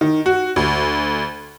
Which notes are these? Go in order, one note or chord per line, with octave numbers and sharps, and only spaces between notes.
D#3
F#4
D2